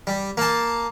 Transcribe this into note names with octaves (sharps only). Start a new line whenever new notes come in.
G3
A#3 A5